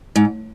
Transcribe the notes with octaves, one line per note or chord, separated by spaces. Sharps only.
G#2